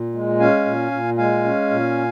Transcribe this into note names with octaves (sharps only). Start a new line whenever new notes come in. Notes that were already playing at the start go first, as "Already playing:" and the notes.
Already playing: A#2
G#3
C#4 F5 G#5
A#2
A#2
G#3 F5 G#5
C#4
A#2